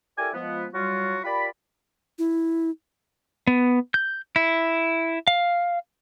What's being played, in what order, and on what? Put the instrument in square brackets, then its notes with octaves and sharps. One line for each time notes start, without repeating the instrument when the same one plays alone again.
[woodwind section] E4 G4 A4 A#4 D5 G#5
F3 G#3 B3
F#3 G3 F4 F#4
F4 G4 A#4 D5 B5
[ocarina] E4
[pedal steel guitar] B3
G6
E4
F5